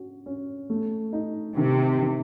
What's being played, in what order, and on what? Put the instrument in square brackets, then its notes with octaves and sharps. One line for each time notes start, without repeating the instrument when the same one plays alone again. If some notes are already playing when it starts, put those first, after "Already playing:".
Already playing: [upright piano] C#4 F#4
C#4
A3
D#4
[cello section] C3 [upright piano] D#3
[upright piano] D#3